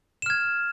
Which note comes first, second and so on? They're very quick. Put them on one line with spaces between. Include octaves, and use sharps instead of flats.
E7 F6 G#6